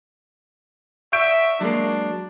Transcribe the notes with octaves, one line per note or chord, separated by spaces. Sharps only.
E5 C#6 G6 D7
F#3 G#3 A#3 D4